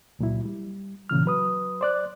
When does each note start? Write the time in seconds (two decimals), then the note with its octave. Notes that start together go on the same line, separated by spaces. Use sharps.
0.19 C#2 A#2 F#3 E4
0.45 G3
1.09 A#2 C#3 E3 F6
1.26 F#3 B4 D#6
1.81 C5 D5 F#6